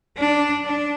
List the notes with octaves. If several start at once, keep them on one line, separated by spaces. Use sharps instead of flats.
D4
D4